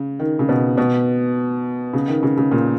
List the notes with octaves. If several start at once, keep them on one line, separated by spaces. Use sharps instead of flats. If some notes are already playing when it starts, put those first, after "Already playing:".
Already playing: C#3
D#3
C#3
B2
B2
C#3
D#3
C#3
C#3
A#2